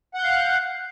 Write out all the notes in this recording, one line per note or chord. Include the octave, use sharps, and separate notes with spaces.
F5 F#5 F#6 G6